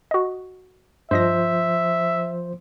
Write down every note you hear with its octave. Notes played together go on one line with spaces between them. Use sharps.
F#4 D#5
G2 F3 C5 D#5 E5 A#6